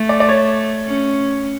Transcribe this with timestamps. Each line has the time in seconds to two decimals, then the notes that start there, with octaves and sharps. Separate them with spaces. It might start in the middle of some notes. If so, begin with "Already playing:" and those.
Already playing: A3
0.09 D5
0.20 D5
0.29 C#5
0.87 C#4